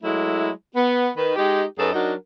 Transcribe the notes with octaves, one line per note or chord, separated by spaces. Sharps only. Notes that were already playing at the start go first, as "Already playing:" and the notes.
F#3 G#3 A3 E4
B3
D#3 B4
G#3 D#4 G4
F#2 D#4 G#4 A4 B4
F#3 D4 D#4 F#4 A#4